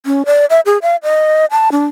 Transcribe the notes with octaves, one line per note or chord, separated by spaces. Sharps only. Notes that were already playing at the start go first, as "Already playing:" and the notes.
C#4
D5
E5
G#4
F5
D#5
A5
D4